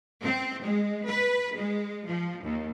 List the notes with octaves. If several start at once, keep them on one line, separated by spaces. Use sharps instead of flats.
C4
G#3
B4
G#3
F3
D#2